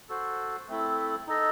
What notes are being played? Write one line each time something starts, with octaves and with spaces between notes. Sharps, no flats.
F#4 A4 C5
A3 C4 E4 A4
D#4 A4 D#5